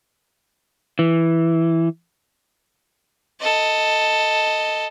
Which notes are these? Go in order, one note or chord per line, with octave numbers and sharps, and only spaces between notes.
E3
A4 D#5